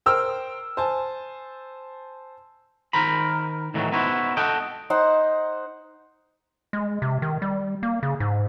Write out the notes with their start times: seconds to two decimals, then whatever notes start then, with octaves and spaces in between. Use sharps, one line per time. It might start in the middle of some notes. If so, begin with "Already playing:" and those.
0.06 A#4 C5 G5 E6 F6
0.77 C5 G#5 A5
2.93 D#3 A#4 C5 A#5 B5
3.74 A2 D#3 E3 F#3
3.92 B3 D#4 E4 F#4 C5
4.37 A4 D#5 F#5 G5
4.90 D#4 C5 F#5
6.73 G#3
7.02 C3
7.22 D#3
7.42 G3
7.83 A#3
8.03 C#3
8.20 G#2